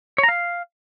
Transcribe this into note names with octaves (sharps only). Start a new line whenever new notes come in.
C#5
A#5
F5